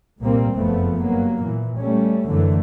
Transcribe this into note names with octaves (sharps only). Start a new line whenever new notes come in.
C2 A#2 G3 A#3 C4
F#1 F2 F3 A3 B3
G2 F#3 A#3
A#2 E3
G3 A3 C#4
F#2 D3 E3 A3